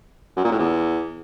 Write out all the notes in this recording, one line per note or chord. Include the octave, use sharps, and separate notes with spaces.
F#2
A#2
A2
E2